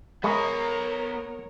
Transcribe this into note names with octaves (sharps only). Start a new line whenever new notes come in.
G#3 B3 A#4 C#5 A#5 B5 C#6 D#6